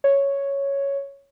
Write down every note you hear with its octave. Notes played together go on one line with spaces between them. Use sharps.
C#5